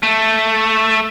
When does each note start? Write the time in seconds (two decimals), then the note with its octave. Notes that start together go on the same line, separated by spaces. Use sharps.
0.03 A3